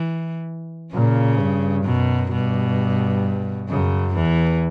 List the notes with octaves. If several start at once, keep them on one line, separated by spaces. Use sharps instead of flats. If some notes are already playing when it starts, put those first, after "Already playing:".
Already playing: E3
A#2 C#3
G2
F#2 B2
G2 B2
F#2 C#3
E2 E3